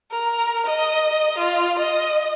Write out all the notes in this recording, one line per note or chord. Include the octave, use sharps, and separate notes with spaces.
A#4
D#5
F4
D#5